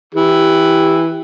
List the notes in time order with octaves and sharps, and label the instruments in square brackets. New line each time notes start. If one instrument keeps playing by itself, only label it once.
[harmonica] E3 [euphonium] G4